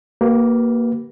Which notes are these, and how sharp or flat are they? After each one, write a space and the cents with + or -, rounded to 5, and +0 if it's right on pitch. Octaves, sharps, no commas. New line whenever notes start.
A#3 +0 G4 -40 B4 -10